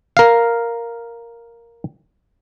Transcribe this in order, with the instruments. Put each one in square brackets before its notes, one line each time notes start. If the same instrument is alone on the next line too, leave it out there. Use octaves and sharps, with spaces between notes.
[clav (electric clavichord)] A#4 F5